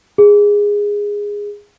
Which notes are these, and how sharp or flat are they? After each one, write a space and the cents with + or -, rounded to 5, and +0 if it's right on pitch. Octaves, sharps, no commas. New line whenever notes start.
G#4 -15